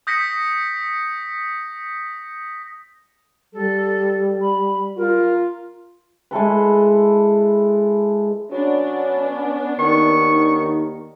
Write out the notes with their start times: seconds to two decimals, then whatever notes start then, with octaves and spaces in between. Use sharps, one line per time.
0.07 D#6 G6 A#6 B6 C#7
3.53 G3 A4
4.41 B5
4.97 F4 A#4
6.31 G#3 E4 A4 B4
8.51 F#3 B3 C#4 D4
9.79 D#2 D#3 C#6